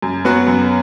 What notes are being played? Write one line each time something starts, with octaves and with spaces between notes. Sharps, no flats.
F#2
F#3 B3 F#4
F#2